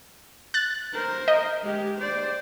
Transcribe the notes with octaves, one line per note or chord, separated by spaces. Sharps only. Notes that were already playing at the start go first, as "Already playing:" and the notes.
F#6 A6
A#4 C5
D#5
G#3 G4
C5 D5